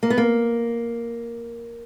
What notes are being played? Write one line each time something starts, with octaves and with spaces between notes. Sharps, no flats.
A#3
B3
A#3